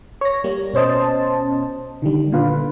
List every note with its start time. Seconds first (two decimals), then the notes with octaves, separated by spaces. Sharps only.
0.21 C#5 A#6
0.44 G3 A#3
0.74 B2 C#4 C5 D#5 A5
2.02 D3 D#3 G3
2.32 A#2 D3 F4 B4